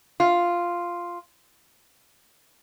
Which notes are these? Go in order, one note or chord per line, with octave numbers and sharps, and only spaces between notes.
F4